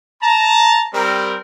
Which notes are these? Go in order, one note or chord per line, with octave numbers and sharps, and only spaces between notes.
A5 A#5
G3 C4 A#4